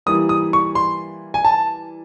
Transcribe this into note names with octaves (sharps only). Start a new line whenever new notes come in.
E3 G3 A#3 D#6
D#6
C#6
C6
G#5
A5